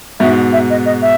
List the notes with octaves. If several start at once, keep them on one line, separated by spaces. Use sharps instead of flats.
G#2 B2 E5
E5
D#5
D#5
E5